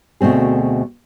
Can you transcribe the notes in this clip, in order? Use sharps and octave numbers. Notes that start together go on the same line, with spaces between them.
D2 B2 A3 C4 G#4